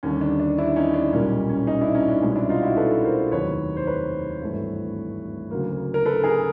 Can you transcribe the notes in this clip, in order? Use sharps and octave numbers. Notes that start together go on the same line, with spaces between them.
D#2 D3 G3 C#4
D4
D4
D4 E4
C#4 D#4
D4
B1 A#2 G3 A#3 C#4
C#4
C#4 D#4
D4 E4
C#4 D#4
D4
C2 B2 G#3 C#4
D4 E4
D#4 F4
E4 F#4
A4 B4
A#4 C5
F1 D#2 D#3 F#3 B4 C#5
C5
B4 C#5
G#1 G2 E3 A3
D2 C#3 F#3 A#3
A#4
A4 B4
G#4 A#4